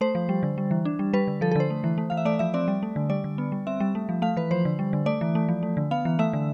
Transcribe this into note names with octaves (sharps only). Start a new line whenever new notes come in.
A3 C5
F3
G3
D3
G3
E3
D4
G3
G3 B4
D3
F3 A4
A4
D3 C5
A3
E3
A3
E3 F5
E5
A3 D5
F3 E5
C4 D5
G3
A3
D3
G3 D5
D3
B3
G3
C4 E5
G3
A3
F3
A3 F5
E3 B4
F3 C5
D3
G3
D3
A3 D5
E3
A3
F3
A3
D3
B3 F5
E3
A3 E5
D3